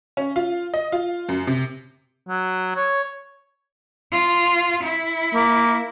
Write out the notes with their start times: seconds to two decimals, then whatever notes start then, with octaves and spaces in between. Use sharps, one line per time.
0.17 C#4
0.36 F4
0.74 D#5
0.92 F4
1.29 F#2
1.47 C3
2.29 F#3
2.76 C#5
4.12 F4
4.83 E4
5.34 A#3